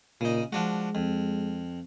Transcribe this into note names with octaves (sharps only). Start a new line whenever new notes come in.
A#2 C#3 D#4
F3 G#3 D4 F#4
F2